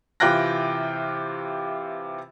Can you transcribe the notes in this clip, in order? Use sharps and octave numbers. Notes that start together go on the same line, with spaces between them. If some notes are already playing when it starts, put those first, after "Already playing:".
C3 E3 F4 G5 F#6 A#6